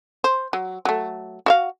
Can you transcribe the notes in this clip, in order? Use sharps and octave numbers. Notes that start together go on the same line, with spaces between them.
C5
F#3
F#3 A3
F#4 E5 F5